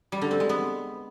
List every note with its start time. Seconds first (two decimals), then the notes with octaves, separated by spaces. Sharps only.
0.12 G3
0.21 D3
0.31 C4
0.40 G#3
0.49 B3